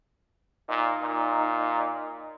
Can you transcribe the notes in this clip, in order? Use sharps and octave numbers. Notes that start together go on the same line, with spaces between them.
A#2 D#4
A#2